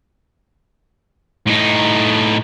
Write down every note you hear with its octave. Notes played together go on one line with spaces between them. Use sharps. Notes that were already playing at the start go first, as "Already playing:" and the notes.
A2 D#4